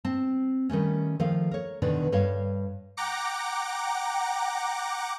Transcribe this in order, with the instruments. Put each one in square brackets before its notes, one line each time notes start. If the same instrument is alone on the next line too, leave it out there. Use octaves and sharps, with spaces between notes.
[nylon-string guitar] C4 A5
D#3 G3 A3 C#4
D#3 F3 A3 F5
A#4 C#5
E2 B2 D3 D#3 D5
G2 C#5 F5
[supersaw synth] F#5 G5 A#5 D6 A#6 C#7